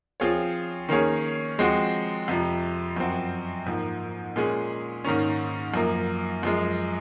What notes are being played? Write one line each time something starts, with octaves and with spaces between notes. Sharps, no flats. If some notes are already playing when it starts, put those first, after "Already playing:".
F3 C4 F4 G#4 C#5
D#3 A#3 C#4 G#4 C#5
F3 G#3 C4 F#4
F2 C3 F3
F#2 F3 C4 F#4
G#2 F3 A#3
A#2 G#3 C#4 G#4
G#2 D#3 A#3 C#4
F#2 F3 A#3
F#2 F3 G#3